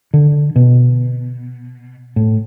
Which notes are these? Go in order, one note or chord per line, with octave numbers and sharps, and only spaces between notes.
D3
B2
A2